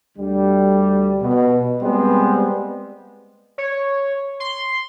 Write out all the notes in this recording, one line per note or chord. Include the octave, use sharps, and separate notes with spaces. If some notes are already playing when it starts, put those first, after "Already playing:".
D2 D3 G3
B2
G3 G#3 B3 C4
C#5
C6